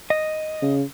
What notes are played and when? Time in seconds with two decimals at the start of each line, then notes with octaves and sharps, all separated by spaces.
0.10 D#5
0.62 C#3